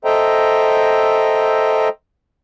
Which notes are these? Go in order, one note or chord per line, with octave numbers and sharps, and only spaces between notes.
A4 C5 D#5 E5 G5 A#5